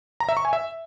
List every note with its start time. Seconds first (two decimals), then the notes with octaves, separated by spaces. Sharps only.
0.20 A#5
0.29 E5
0.37 C#6
0.45 G#5
0.53 E5